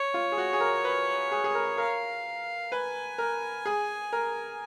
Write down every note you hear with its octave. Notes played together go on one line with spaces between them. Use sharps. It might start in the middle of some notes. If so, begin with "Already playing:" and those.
Already playing: C#5
F4
G#4
F#4
G#4
A#4
B4
G#4
G#4
A#4
A#4 F5
B4 G#5
A#4
G#4
A#4